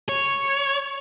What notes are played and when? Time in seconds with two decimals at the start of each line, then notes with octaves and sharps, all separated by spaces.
0.09 C#5